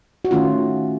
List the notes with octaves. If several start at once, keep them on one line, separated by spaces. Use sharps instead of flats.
F#4
D#3 A3 C#4 F4